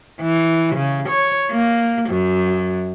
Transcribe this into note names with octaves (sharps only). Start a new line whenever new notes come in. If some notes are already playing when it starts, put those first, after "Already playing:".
E3
C#3
C#5
A#3
F#2